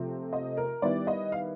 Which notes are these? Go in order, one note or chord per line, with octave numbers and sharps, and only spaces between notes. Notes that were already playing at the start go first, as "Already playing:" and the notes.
Already playing: C3 F3 A3 C4
D#5
A#4
D#3 G3 B3 E4 D5
D#5
F5